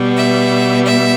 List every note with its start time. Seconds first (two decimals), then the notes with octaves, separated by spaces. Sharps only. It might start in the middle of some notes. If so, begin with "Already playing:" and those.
Already playing: B2 G3 B3
0.16 E5
0.85 E5